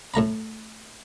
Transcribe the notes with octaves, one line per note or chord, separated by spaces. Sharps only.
A2 A3 A#5 B5